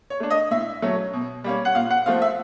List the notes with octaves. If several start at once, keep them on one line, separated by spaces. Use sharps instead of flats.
C#5
A3 D4
D#5
A2 E5
F#3 A3 C#4
B2
G3 A#3 C#4
F#5
A#2 F5
F#5
F3 A3 C4 F5
E5